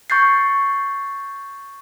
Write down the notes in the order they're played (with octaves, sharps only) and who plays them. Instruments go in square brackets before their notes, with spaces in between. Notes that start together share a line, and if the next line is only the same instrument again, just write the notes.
[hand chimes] C#6 G6 A6 C7